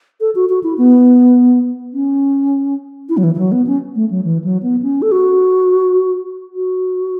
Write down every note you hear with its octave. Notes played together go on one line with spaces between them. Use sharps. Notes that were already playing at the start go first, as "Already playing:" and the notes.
A4
F#4
F#4
E4
B3
C#4
E4
F#3
E3
E3
F#3
B3
C#4
A3
F#3
E3
F#3
B3
C#4
A4
F#4
F#4